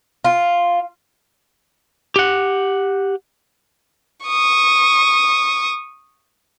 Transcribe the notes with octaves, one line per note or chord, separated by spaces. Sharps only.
F4
G4 F#5
C#6 D#6